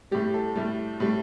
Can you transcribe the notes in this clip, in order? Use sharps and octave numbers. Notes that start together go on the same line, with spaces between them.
A2 G3 G4
A4
A2 G3
A2 G3